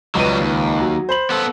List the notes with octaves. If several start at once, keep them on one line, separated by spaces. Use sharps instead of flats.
C#2 F#3 G3 B4 D#7
D#2
F#3
C5 B5 F#7
B3 A4